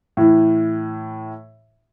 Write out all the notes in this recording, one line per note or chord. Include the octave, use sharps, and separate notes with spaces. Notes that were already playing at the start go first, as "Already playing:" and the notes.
A2 E3